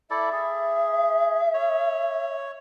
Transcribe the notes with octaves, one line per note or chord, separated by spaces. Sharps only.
E4 A4 D5 E5
G#4
C#5